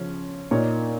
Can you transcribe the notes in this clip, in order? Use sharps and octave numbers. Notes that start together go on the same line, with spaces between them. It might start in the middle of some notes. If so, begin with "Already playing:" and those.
Already playing: C#3 F3 C#4
A#2 A#3 D#4 C#5